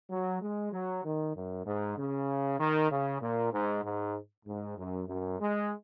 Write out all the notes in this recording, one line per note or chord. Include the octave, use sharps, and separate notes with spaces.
F#3
G#3
F#3
D#3
F#2
G#2
C#3
D#3
C#3
A#2
G#2
G#2
G#2
F#2
F#2
G#3